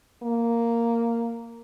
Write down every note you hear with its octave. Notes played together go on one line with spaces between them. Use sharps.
A#3